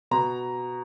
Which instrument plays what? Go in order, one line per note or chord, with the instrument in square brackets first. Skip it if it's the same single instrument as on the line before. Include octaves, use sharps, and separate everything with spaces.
[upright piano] B2 A#5